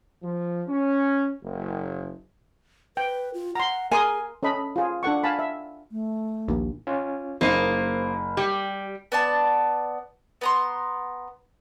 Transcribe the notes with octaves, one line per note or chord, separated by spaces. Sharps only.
F3
C#4
F#1
B4 G5
F4
F#5 A#5 C6
G#4 A#4 G#5 C6 D#6
C#4 A4 D#5 B5
F4 G#4
D4 A4 F#5 C#6
F5 G#5 A5 B5
E5
A3
A#1 D#2
C#4 F4
F#1 A#3 D#4 C5 C7
G3 G4
B3 D5 A5
B3 A#5 C6